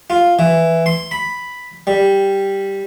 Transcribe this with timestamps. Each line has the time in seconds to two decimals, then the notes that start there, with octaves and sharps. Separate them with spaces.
0.10 F4
0.39 E3
0.86 C6
1.11 B5
1.87 G3